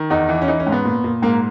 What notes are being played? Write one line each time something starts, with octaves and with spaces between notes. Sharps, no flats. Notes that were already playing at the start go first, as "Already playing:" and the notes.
Already playing: D#3
E2 D#4
E3
C#4
E3 D#4
C#4
G#2
B3
A#2
A#2
G#2 A#3